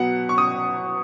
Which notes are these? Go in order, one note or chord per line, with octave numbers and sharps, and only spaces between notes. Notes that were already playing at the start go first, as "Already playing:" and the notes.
Already playing: B2 F#3 B3 F#5
C#6
D#6